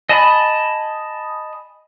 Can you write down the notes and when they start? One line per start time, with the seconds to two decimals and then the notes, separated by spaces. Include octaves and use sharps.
0.09 D#5 G#5 A5 B5